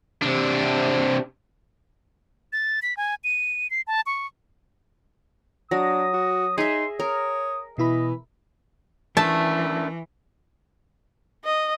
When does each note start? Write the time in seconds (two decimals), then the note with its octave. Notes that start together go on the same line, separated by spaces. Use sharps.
0.22 C3 D4
2.53 A6
2.82 B6
2.97 G#5
3.24 D#7
3.70 C7
3.87 A5
4.06 C#6
5.71 F#3 D4 D#6 A#6
6.13 F#4
6.58 D#4 G#4 E5 C6
7.00 A#4 C#5 D#6
7.78 B2 E3 E4 D#5 B5
9.17 E3 A3 C#4 D4 A#4 A5
11.45 D#5